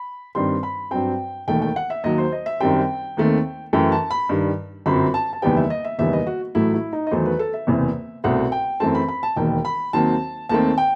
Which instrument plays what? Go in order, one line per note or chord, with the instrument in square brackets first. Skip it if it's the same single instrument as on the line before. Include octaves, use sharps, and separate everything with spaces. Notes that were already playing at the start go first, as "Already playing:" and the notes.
Already playing: [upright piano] B5
G2 D#3 G3 C4 C6
B5
G2 F#3 C4 G5
E1 D#2 D#3 A3 G5
G5
F#5
E5
D#2 D#3 F#3 D#5
C5
D#5
E5
F#2 D#3 G3 C4 G5
D#2 D#3 A3 C4
F#2 E3 A3 G5
A5
B5
G2 D#3 G3
G1 F#2 F#3 C4 B5
A5
A5
F#1 E2 D#3 G3 B3 G5
E5
D#5
E5
F#1 E2 D#3 G3 B3 E5
D#5
F#4
A1 A2 F#3 A3 E4
E4
D#4
D#5
E2 D#3 F#3 A3 C5
B4
A4
E5
F#1 E2 C3 E3
C2 B2 A3 C4 F#5
G5
F#2 E3 A3 C4 A5
B5
B5
A5
E1 D#2 D#3 G5
B5
D#2 D#3 F#3 C4 A5
D#2 D#3 A3 C4 A5
G5